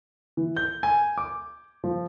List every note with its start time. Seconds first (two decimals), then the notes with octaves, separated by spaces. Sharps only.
0.37 E3
0.57 G6
0.83 G#5
1.18 D6
1.84 F3